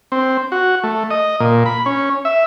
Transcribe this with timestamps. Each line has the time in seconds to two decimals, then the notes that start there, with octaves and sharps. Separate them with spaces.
0.12 C4
0.52 F#4
0.84 A3
1.11 D#5
1.40 A#2
1.66 B5
1.86 C#4
2.25 E5